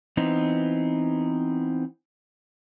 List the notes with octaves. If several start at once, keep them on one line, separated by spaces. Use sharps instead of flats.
E3 B3 C4 D#4